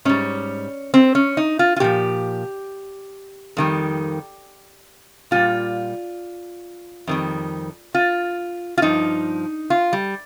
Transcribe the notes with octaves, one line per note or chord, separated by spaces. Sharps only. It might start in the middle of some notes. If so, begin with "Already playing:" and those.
G#2 G3 C#4
C4
C#4
D#4
F4
F4
A#2 F3 G4
F2 D#3 G3
A#2 G3 F4
F2 D#3 G3
F4
F4
G2 F3 D#4
F4
G3